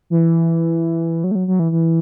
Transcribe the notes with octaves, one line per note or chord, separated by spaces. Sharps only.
E3
F#3
A3
F#3
F#3
E3
E3